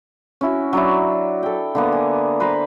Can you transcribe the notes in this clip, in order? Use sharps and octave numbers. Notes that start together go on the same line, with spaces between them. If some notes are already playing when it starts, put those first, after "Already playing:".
C#4 E4 F#4
F#3 D4 E4
A4 G5
D3 A#3 B3
G#5
B4 C5 A#5 B5